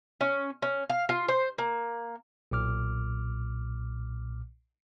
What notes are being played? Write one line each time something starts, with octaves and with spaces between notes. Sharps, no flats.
C#4
C#4
F5
F4
C5
A#3
B1 A#2 D6 F6